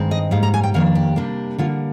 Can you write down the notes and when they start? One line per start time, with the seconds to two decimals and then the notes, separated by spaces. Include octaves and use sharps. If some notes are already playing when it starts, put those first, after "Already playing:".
Already playing: G2 D#3 G#3 C4
0.11 D#5
0.31 G#2 G3 A#3 F5
0.43 A#5
0.54 G#5
0.63 G5
0.74 F2 D#3 A#3 D4 F5
0.95 G4
1.16 C3 G3 A#3 D4
1.58 D3 G3 A#3 F4